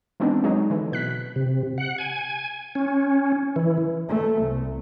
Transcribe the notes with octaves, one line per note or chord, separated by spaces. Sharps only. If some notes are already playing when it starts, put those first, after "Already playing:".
E3 G#3 B3 C4 D4 D#4
F#3 G#3 D#4
D3 E3
B2 F#6 B6
C3
F#5
G#5
C#4
E3
A3
C2